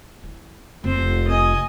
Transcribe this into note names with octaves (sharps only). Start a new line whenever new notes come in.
E3
F1 F2 C4 C5
D#5 G#5